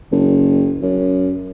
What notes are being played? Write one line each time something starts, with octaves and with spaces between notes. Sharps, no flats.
F#1
F#2